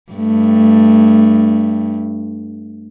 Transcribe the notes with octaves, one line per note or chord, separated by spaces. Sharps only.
G2 A3